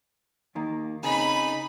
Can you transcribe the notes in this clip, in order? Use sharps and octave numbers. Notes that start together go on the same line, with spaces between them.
D#2 D#3 A#3
C#3 C4 D#4 G#4 B5